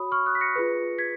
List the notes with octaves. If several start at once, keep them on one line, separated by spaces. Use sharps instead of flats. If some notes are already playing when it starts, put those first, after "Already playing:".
Already playing: F#4 C#5 B5 D#6
C#6 F6
D#6 F#6
B6
A#6 C#7
F4 G#4 B4
G#6 B6